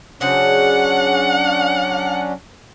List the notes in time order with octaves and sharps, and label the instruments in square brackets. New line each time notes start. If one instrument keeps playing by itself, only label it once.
[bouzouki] C#3 G#4 C5 [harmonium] F#3 C#4 D4 [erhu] F#5